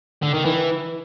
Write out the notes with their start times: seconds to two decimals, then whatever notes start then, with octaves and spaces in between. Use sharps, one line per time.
0.23 D3
0.34 D#3
0.45 E3